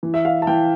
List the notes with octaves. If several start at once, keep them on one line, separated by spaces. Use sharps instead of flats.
E3
E5
F5
A5
E3 G5